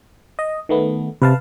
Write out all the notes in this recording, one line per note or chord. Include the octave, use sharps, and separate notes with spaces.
D#5
D#3 A3 B3
C3 B4 F5 A5